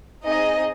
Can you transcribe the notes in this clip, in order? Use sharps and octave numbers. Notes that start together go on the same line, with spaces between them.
C4 D#4 G#4 D#5